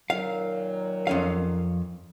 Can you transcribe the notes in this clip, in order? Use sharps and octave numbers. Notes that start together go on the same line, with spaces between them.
A#2 D#3 F#3 F5
F2 C#4 F5